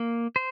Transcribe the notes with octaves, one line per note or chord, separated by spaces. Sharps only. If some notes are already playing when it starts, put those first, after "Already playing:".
Already playing: A#3
C5